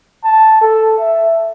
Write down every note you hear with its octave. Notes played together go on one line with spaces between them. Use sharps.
A5
A4
E5